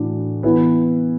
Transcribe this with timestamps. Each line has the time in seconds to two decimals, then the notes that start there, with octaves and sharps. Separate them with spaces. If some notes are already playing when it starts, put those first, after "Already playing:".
Already playing: A2 E3 D4 F#4
0.43 E3 B3 E4